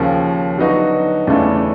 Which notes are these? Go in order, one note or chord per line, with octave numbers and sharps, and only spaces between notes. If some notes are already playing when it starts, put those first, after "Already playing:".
Already playing: D#2 C#3 F3
D3 F#3 B3 D#4 F#4
E2 C#3 E3 A3 D4